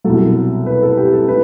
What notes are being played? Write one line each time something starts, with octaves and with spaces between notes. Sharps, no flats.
C2 B2 F#3 A4
B4
A4
G4
A4
E4 B4